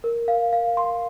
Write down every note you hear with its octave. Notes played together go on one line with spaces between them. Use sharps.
A#4
F5
F5
C6